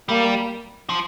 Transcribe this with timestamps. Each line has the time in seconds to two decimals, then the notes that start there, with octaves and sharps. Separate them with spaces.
0.09 G3 A#3
0.89 F3